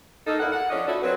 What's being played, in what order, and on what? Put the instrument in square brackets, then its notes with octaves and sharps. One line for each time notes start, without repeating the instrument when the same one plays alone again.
[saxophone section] A#3 D#4 A4
E2 A#3 E4 F#5
F#5
F3 C#4 D4 F4 D5 D#5
E4 F#4 A4
F#3 C4 B4